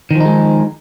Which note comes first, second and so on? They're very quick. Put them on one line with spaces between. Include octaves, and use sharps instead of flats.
D#3 F3 D#4 G#3